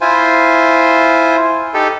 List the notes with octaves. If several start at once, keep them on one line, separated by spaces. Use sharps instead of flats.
E4 F4 C5 G#5
D#4 G4 A4